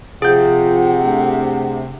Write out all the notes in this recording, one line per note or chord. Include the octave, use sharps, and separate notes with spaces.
C3 F3 F4 G#4 F#5 G6
A3 D4